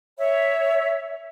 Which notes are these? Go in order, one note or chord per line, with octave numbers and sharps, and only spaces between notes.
C#5 E5